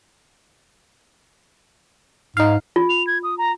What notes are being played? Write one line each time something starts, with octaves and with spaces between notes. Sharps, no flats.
G#2 D#4 F5
F4
F7
G#6
D#6
A#5